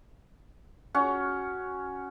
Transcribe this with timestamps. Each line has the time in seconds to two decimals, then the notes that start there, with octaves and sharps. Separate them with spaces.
0.94 C#4 F#4 F#5